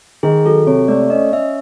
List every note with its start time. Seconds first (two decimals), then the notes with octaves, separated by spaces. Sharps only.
0.23 D#3 G#4
0.45 F#3 A4
0.67 C3 C#5
0.88 A3 D5
1.10 C#4 D#5
1.32 C#4 E5